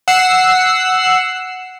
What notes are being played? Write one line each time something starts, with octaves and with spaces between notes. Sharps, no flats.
F#5 E6 C7